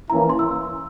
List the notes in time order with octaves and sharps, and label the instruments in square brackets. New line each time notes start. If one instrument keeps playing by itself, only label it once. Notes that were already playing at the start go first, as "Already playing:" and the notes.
[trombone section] E3 A#3 C#4 E4 [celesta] A#5
[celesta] C6
E6